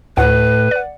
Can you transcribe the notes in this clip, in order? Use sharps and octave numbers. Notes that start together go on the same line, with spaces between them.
D2 A2 B4 F#5
D5 F#5